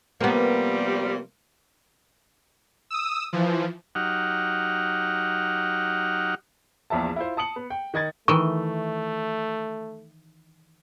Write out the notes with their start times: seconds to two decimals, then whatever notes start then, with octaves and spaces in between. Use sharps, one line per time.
0.21 C3 F3 G3 A#3 B3
2.90 D#6 E6
3.33 E3 F3
3.95 F#3 D#4 G4 F#5 F6
6.90 A#1 E2 F3 E5 A5
7.16 E4 F4 C5
7.37 A5 D#6 C#7 F#7
7.56 B3
7.70 G5
7.94 D#3 D#5 G#6 A6
8.28 D#3 E3 A3 C#6